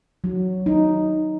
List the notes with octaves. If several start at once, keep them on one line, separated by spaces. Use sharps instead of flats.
F#3
D#4